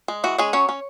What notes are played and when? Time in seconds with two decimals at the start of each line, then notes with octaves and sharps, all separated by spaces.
0.08 G#3
0.24 E3 F#4
0.38 G#3 C#4 G#4
0.53 F#3 C#4 C#5
0.69 C#4